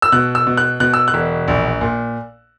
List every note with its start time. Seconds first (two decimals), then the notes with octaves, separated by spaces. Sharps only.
0.02 E6
0.12 B2 F#6
0.35 E6
0.47 B2
0.57 F#6
0.80 B2 F#6
0.94 E6
1.08 F#6
1.14 E1
1.48 A#1
1.81 A#2